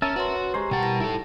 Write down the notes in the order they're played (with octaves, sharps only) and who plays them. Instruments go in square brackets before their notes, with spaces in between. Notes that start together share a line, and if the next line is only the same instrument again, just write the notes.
[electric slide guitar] C#4 [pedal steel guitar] A#4 E5 A5
[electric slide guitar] F#4 [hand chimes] B4 C#5 C6
[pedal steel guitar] G#3 C5 [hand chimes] G4 A#5 C#6
[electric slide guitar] B2 F#5 [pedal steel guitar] G3 A#4 A5 [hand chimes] G5
[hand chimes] E4 A#6
[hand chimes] D#4 [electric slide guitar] E4 A4